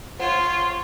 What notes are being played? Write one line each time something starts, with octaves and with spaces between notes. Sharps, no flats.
F4 C5 C#5 F#5 C6